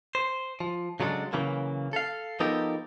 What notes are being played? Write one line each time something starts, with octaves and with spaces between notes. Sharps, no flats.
C5
F3
C#3 F#3 G#3 D4 A4
C#3 E3 F#3 A#3
A4 F5
F3 B3 D#4 G4 A4 A#4